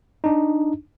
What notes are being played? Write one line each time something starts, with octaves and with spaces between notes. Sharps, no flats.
D4 D#4